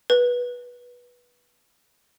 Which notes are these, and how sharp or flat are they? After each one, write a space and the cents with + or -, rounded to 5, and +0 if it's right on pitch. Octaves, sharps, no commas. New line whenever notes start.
B4 -15